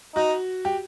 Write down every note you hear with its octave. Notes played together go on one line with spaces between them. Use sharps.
D#4 F#4
G4